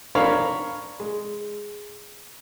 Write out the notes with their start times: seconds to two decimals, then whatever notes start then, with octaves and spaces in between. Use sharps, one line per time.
0.15 D4 A#4 C#5 F5 A#5 B5
1.00 G#3